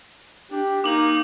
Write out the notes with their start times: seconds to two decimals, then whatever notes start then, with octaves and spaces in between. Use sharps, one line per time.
0.51 D4 G4
0.84 A#3 D#4 D6 F#7